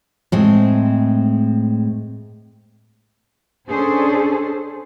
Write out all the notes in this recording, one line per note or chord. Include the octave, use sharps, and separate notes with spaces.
A2 G#3 C4
C#4 D4 G#4 A4 C5